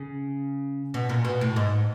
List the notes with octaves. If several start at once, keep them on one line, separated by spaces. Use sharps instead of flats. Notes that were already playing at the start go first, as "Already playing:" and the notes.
Already playing: C#3
B2
A#2
B2
A2
G#2